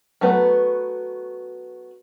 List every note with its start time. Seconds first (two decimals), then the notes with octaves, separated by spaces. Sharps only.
0.21 F#3 A3 B3 B4